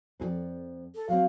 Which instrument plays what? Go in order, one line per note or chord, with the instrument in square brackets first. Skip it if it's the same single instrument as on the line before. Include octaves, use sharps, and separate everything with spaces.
[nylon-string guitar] F2 G#4 D5
[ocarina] A4
[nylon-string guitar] F#3 C4 [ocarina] F5